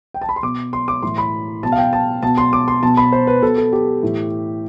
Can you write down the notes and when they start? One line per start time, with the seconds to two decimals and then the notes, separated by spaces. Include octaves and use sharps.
0.14 G5
0.21 A5
0.29 B5
0.36 C6
0.43 B2 D6
0.73 C6
0.88 D6
1.03 A2 E3 C6
1.18 B5
1.63 B2 A5
1.72 F5
1.78 G5
1.93 A5
2.23 B2 A5
2.38 C6
2.53 D6
2.68 C6
2.83 B2 A5
2.97 B5
3.12 C5
3.27 B4
3.42 B2 A4
3.58 A4
3.73 G4
4.03 A2 E3